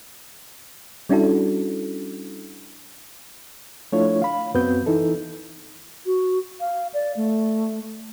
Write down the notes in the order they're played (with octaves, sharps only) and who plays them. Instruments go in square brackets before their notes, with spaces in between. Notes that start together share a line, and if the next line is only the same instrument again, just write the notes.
[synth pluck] G3 C#4 D4 E4 F#4 A4
[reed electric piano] F3 A3 D4 E4 F4 C#5
F5 B5
F#2 B3 C4 F#4 B4 G6
E3 D#4 E4 A4
[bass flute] F#4
F5
D5
A3